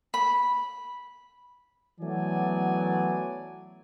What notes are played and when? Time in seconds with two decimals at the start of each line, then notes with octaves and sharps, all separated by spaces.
0.14 B5
2.00 E3 F#3 A3 B3 D5 G#5